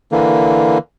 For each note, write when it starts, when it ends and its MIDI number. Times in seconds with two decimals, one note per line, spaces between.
0.12 0.78 50
0.12 0.78 52
0.12 0.78 58